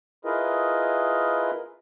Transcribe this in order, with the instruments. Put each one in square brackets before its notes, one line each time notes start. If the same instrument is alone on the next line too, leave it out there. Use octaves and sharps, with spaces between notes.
[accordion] E4 F4 G#4 A#4 B4 D#5